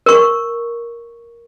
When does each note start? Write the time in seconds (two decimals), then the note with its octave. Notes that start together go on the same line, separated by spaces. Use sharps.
0.06 A#4 C#6